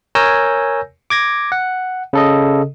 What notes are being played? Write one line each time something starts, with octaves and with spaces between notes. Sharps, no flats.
A#4 C#5 G#5 E6 G6 A#6
D6 G#6 A#6
F#5
C#3 A4 D#5